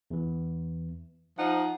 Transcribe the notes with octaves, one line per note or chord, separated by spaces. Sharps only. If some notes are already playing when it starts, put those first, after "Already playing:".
E2 E3
F3 D#4 F#5